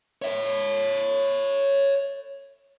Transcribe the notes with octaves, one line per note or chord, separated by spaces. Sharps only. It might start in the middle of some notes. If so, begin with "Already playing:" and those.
C#5 E5